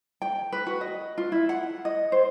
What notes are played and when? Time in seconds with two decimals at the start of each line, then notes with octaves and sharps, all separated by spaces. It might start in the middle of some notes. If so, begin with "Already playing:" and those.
0.22 G5
0.52 B4
0.67 F#4
0.81 D#5
1.18 F4
1.32 E4
1.49 F#5
1.85 D#5
2.12 C5